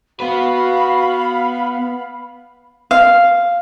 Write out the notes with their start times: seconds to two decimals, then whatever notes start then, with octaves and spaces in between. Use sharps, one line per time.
0.20 B3 F#4 B4 F5 B5
2.91 F5